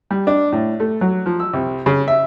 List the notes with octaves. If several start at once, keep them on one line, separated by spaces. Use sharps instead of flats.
G3
D4
A2
A3
F#3
F3
E6
C2
C#3
E5